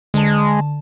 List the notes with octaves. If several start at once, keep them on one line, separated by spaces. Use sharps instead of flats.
D3 G#3 A5